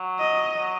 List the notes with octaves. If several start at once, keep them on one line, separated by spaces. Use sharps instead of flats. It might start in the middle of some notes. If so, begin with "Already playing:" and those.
Already playing: F#3
D#5
F#3